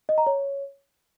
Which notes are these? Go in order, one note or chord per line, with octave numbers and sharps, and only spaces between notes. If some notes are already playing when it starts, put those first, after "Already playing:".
D#5
A#5
C#5